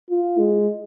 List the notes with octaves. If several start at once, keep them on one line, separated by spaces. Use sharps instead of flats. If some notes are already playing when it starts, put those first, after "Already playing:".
F4
G#3